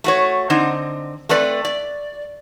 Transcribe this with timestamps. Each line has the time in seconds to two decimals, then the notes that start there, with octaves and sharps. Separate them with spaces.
0.04 A3 F#4 C#5
0.50 D3 C4 D#4
1.29 A3 C4 B4 D5
1.65 D5